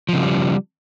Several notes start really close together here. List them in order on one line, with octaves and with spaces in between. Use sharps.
F3 C#3 G#3 G3